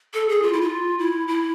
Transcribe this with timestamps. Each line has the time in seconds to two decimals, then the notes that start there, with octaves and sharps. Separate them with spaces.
0.14 A4
0.29 G#4
0.43 F4
0.53 E4
0.61 F4
0.99 E4
1.28 E4